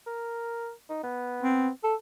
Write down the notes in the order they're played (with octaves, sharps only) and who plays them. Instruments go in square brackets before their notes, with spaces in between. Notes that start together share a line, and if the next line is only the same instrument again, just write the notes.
[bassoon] A#4
D#4
B3
[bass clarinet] C4
A4